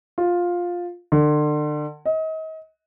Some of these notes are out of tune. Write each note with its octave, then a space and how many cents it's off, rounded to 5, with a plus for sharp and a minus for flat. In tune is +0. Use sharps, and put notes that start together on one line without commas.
F4 +10
D3 +35
D#5 +35